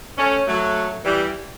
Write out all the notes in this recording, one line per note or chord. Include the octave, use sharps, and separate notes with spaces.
A3 C#4
F#3 A3
E3 G3